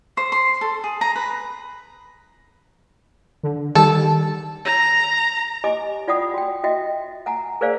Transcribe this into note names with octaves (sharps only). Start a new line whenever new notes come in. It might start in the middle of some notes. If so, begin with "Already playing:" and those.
C5
C6
A4
G#4
A#5
B4
D3
D#3 G3 A4
A#5
G4 D#5 G#5 D6
F4 D5 F#5 G5 D#6
F#4 G5
F#4 D#5 E5 G5
F#5 G#5 A#5
G#4 A#4 C5 D5 F5 G#5